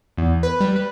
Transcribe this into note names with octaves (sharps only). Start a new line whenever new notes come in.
E2
B4
G3
B4